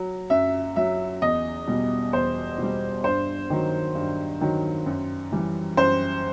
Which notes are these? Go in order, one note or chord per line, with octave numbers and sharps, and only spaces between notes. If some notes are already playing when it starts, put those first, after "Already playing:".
Already playing: F#3
F#2 E5
F#3 E5
E2 D#5
B2 G3
E2 C5
B2 G3
G2 C5
D#3 F#3
G2
D#3 F#3
F#2
E3 G3
F#2 C5